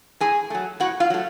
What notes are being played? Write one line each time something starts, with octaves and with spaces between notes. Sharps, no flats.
A2 G#4 G#5
F#3 A3
A2 F#4 F#5
F4 F5
F#3 A3